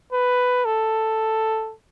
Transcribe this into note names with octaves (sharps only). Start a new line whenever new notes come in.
B4
A4